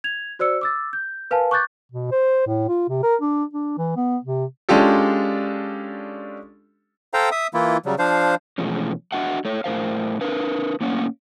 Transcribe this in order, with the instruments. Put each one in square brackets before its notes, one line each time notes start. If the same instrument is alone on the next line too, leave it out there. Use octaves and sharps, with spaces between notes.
[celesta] G#6 F7
F#4 C5 D5 E6 C#7
D6 E6 A6
G6
A#4 B4 F5 G#5 A5
C#6 D6 F#6 G6 A6
[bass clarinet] B2
C5
A2
F4
C3
A#4
D4
D4
E3
B3
C3
[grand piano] G#3 C#4 D4 F4 G4 A4
[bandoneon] A4 C5 F5 G5 A#5
E5 D#6
E3 A#3 E4 F4
C#3 F#3 G3
F3 D4 C5 F5
[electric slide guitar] B2 E3 F3 G#3 A3 C#4
D4 F#4 D#5 E5 F#5
A3 C#5
A2 A#4 C5 F5
D4 A#4 B4 F5
A2 A#3 C#4 C#5 F#5